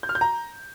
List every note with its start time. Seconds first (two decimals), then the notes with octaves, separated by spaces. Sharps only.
0.03 G6
0.09 F6
0.15 G6
0.21 A#5